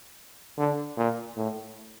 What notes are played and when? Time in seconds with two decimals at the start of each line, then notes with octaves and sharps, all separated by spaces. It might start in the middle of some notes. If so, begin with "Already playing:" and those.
0.58 D3
0.97 A#2
1.36 A2